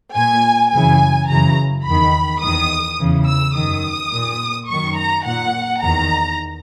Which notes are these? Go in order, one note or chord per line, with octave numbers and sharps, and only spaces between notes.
A#2 G#5
F#2 C#3 E3 G#5
F#2 C#3 E3 A#5
E2 D#3 B5
E2 D#3 D#6
E2 C#3 E3
E6
F#2 D#3 D#6
A#2
F#2 D#3 C#6
A#5
A#2 F#5
E2 D#3 A#5